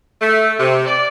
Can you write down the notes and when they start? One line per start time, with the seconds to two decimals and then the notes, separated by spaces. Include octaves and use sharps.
0.22 A3
0.58 C3
0.87 D5